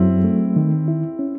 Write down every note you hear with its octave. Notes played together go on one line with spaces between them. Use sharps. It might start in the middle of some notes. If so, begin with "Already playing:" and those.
Already playing: F#2 F#3 C4 E4
A3
D#3
E4
C#4